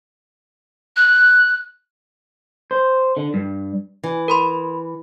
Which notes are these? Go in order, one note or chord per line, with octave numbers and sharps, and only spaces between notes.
F#6
C5
D3
G2
E3
A#4 B5 C6